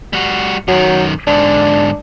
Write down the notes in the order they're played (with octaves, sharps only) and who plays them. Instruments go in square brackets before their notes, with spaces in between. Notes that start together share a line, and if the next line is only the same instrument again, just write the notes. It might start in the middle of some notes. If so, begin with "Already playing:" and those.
[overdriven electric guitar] G3 F#4
[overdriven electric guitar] F#2 D#3 [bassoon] F#3
[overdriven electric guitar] G#2 D3 [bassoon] D4